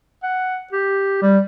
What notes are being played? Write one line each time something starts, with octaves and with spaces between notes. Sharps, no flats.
F#5
G4
G3